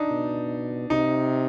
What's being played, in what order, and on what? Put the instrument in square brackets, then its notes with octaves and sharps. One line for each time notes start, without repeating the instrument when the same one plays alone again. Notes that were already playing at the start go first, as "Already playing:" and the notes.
Already playing: [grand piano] D4 D#4
[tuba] B2
[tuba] C3 [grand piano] D#4